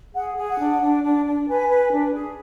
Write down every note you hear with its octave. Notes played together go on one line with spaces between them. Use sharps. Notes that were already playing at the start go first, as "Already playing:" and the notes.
G#4 F#5
G#4
F#5
D4
D4
D4
D4
B4 G#5
B4
D4
G#4